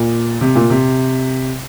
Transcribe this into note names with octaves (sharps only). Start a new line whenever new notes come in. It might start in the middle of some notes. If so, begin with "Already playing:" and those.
Already playing: A#2
C3
A#2
C3